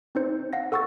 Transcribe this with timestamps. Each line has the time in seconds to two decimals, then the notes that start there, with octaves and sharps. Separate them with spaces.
0.15 C4 D#4 C5
0.53 F5 F#5 A#6
0.72 A4 F#5 C#6 E6 A6